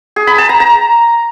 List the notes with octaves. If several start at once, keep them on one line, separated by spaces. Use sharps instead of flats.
G#4
B5
A5
A#5
A#5